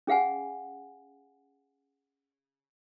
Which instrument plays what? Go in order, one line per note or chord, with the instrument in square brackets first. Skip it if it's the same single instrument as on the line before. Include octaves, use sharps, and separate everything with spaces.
[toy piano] C#4 G#4 F5 F#5 G#5